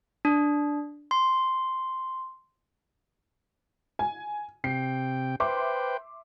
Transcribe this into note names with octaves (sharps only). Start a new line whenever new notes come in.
D4
C6
G#5
C3 G5 C7
B4 C5 E5 G5 C6 D6